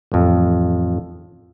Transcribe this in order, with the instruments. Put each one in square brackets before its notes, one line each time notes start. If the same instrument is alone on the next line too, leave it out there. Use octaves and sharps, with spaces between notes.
[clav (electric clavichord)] A1 F2